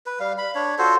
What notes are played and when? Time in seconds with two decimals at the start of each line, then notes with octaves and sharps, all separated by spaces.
0.06 B4
0.20 G3 F5
0.38 B5
0.55 D4 C#5
0.79 F4 F#4 A4 C5